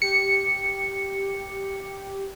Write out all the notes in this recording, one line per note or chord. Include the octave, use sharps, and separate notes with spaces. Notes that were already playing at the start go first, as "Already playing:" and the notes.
G4 C#7